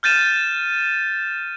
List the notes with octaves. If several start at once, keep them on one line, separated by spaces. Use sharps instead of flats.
F6 G6 A6 D#7 E7